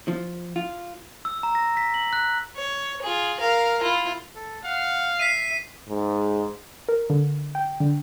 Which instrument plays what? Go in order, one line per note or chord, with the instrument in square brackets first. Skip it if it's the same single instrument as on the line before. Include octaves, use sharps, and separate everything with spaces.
[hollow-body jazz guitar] F3
F4
[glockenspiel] E6
A#5
A#6
B6
F#7
F#6
[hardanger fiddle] C#5
F4 G#4
A#4 F5
E4 F4
[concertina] A4
[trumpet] F5 [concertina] F#5
[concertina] E5 [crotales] B6 C7 D#7
[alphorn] G#2
[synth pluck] A#4
D3
G5
D3